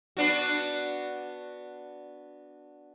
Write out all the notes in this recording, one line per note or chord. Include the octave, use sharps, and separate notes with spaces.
B3 D4 F#4